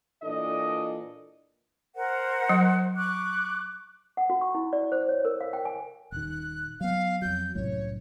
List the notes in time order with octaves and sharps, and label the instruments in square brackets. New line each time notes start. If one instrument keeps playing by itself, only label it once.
[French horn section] A#2 E3 D4 A4 D5 D#5
[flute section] A#4 C5 F#5
[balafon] F#3
[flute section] C#6 D6 F#6
[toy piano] F#5
F#4
C#6
E4
D5
C5
C#5
A#4
F5
G5
G#5
[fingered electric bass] D#1 D#3 [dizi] F#6
[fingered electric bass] F#3 B3 [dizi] F5
[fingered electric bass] F2 F#3 [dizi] G6
[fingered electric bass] C2 F#2 A2 [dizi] C#5